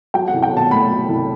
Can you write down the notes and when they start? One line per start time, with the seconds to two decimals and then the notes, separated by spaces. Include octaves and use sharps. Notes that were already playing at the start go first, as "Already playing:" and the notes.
0.14 F#3 G5
0.28 F#5
0.33 C2
0.43 G5
0.53 B2 A5
0.71 A3 B5
0.90 F#3
1.09 C2